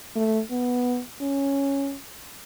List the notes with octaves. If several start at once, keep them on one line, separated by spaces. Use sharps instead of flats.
A3
B3
C#4